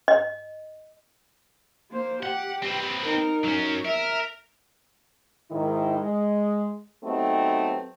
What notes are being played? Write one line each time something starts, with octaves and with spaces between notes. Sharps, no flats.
D#5
A#3 C5
G4 F#5
C4 B4
D#4 A#4
F#3 C#4
A#4 E5
G#2 D#3 E4
G#3
F#3 A3 B3 C4 D#4 G4